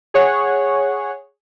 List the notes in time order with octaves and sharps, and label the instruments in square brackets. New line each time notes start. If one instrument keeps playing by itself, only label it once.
[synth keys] G#4 C#5 F#5